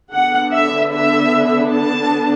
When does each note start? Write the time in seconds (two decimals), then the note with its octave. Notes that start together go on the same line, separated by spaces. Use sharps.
0.12 D3 B3 D4 F#5
0.53 E5
0.94 E5
1.75 A5